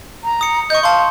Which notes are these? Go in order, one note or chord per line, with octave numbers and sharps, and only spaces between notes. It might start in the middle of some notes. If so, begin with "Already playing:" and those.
A#5
D#6 C#7
D#5 C#6 G6
F5 A5 C6